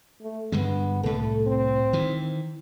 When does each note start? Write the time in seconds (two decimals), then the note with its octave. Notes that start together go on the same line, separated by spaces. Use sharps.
0.21 A3
0.52 G2 D3 G#3 B3
1.03 C2 A2 A4
1.47 C4
1.93 D#3 E3